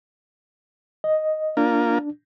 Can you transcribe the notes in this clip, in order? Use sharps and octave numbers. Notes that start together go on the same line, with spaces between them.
D#5
A#3 D4 F4